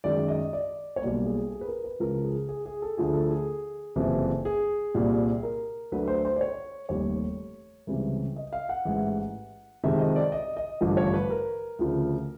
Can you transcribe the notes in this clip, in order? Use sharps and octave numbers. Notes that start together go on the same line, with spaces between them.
F#2 D#3 G#3 D5
D#5
D5
C#5
B1 B2 G3 A#3 D5
G#4
G#4
B4
A#4
B4
C#2 C#3 F3 A#4
G#4
G#4
G#4
A4
D2 D3 F3 A3 G#4
A4
G#4
F#1 F2 C3 E3
G#4
C2 A#2 G3
A#4
D2 D3 F#3 A3 B4
C5
C5
D5
C#5
F1 D#2 D#3 G3 C#5
C#2 C3 E3 G3
D#5
F5
F#5
A1 G#2 E3 G#3
F2 C3 D#3 G#3 E5
D#5
D5
D#5
D#5
A1 G2 D3 F3
C#5
B4
A#4
D2 C#3 F3